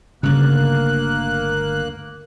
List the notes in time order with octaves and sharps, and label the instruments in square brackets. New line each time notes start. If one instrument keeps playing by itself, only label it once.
[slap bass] G1 D2 [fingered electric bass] G2 C#3 [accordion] A#3 F#6